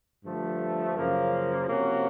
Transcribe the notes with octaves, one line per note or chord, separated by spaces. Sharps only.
G2 D3 F3 A3
F#2 C#3 F3 A#3
C3 F3 A#3 C#4 F#4